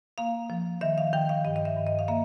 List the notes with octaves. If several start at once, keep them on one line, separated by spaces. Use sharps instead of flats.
A#3 F5
F3
D#3 E5
F5
D#3 G5
F5
G2 D#5
D#5
E5
G2
D#5
F5
A#3 E5